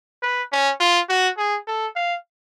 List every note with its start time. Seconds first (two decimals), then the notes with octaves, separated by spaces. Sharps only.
0.23 B4
0.52 C#4
0.80 F4
1.09 F#4
1.38 G#4
1.67 A4
1.96 F5